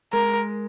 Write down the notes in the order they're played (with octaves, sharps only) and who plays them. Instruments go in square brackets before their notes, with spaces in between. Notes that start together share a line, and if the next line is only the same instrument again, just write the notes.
[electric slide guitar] G#3 [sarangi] A#4